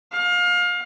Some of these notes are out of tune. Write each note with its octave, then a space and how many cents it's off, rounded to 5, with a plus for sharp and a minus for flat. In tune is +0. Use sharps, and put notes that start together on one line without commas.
F5 +30